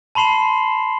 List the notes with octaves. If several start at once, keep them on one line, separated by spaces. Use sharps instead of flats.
A5 B5 C6 C7 E7